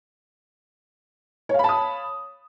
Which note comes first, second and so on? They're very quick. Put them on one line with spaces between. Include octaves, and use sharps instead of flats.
C#5 F5 B5 A5 D#6